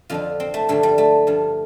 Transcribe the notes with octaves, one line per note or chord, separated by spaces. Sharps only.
F2 D3 F3 F4
C4
A3
G2 D3 F3 A3
G3
A3
G2 F3